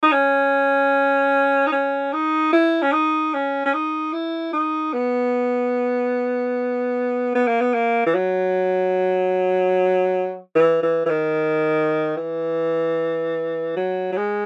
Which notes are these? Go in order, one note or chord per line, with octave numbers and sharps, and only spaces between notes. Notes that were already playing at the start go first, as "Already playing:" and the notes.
D#4
C#4
D#4
C#4
D#4
E4
C#4
D#4
C#4
C#4
D#4
E4
D#4
B3
B3
A#3
B3
A#3
E3
F#3
E3
E3
E3
D#3
E3
F#3
F#3
G#3